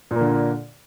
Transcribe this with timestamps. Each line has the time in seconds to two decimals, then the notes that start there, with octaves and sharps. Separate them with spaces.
0.11 A#2
0.16 A#3
0.21 D3